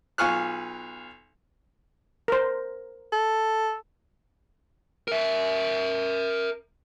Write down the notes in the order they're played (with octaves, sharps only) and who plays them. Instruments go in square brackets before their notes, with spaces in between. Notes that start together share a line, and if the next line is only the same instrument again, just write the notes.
[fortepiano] B1 F4 G#5 C#6 F6 F#6
[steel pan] A#4 C5
[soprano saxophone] A4
[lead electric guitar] A#4 E5